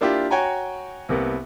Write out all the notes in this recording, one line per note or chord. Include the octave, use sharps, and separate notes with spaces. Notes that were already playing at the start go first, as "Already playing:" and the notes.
A#3 D4 E4 F4 G4
F#4 C#5 G5 G#5 A#5
C2 C3 A#3 B3